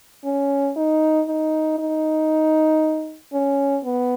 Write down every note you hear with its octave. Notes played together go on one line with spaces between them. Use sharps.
C#4
D#4
D#4
D#4
C#4
B3